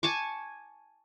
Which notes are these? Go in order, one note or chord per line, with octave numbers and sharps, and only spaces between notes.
G#5 A5 C#6 D6